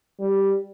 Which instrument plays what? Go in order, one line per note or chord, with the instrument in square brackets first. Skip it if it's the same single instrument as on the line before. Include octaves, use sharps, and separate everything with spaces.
[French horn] G3